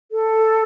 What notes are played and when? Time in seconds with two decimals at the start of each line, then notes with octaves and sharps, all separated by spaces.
0.12 A4